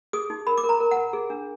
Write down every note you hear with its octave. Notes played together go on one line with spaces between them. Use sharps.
G#4 D#6
D#4
A#4 B5
D6
A#4
A#5
A#4
F#5
A#4
G#4
D4